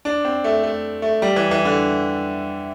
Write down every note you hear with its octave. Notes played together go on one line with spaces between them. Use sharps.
D4
C4
A3
A3
A3
G3
E3
E3
D3